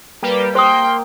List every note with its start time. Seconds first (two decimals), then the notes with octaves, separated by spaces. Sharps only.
0.22 G3 A#3 G4 B4
0.55 A#3 C5 G5 C6 D#6